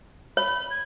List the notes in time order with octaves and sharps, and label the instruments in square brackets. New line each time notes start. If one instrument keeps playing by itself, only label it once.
[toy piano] C#5 [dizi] B5
[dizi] G#6